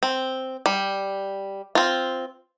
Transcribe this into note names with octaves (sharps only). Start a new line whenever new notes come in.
C4
G3
C4 F4